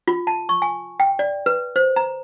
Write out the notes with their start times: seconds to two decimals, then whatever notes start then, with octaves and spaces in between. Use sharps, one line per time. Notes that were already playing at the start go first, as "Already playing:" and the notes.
0.08 F4
0.27 A5
0.49 C#6
0.62 G#5
1.00 G5
1.19 D5
1.46 B4
1.76 C5
1.96 A#5